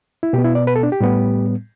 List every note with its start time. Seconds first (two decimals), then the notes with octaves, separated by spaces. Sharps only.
0.23 E4
0.33 B2 G4
0.38 B3
0.45 E4
0.55 D5
0.67 B4
0.76 A4
0.83 D4
0.92 G4
1.00 A2 G3 B3